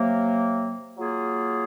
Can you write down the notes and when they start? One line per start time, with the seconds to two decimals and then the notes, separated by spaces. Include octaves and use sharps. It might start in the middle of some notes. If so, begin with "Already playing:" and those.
Already playing: C3 F#3 A#3
0.95 F#3 A#3 F4 G#4